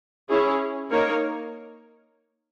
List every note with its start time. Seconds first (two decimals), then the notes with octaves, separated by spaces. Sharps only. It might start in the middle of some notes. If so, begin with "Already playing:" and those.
0.29 C#4 E4 G#4 C#5
0.89 A#3 D#4 A#4 C#5